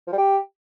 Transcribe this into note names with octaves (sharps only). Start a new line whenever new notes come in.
F3
G3
G4